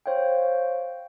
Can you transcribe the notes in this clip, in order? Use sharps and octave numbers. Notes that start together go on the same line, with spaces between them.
C5 C#5 F5 G5